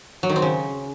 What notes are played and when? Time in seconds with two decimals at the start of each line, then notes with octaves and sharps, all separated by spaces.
0.23 F#3
0.29 D#3
0.36 C4
0.42 C#3